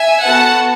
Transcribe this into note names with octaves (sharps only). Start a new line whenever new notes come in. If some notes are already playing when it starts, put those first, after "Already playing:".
Already playing: E5 G#5
B3 F#4 A4 F#5 A5